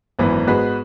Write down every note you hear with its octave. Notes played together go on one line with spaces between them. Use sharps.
G#1 F#2 E3 B3
G#2 G#3 B3 F#4 B4